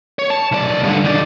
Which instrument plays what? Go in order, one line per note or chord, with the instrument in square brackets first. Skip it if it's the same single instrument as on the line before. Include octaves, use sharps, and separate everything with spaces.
[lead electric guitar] C#5
A5
B1 D5
G2 D3
D#3 D5